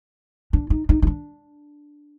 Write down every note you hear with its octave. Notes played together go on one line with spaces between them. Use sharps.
D4
D#4
D#4
D#4
D4